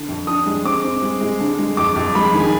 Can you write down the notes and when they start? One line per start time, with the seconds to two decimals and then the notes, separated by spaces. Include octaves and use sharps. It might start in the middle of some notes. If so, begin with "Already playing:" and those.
Already playing: D3
0.08 F2
0.27 D4 D#6
0.46 G#3
0.65 C4 D6
0.84 C4
1.02 G#3
1.21 G#3
1.40 D3
1.59 G#3
1.77 F2 D6
1.96 F2
2.15 G#3 B5
2.34 D#3
2.39 G#5